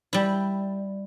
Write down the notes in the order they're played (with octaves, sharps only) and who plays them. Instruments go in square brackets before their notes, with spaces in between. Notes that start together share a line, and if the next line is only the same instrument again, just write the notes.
[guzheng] G3 E4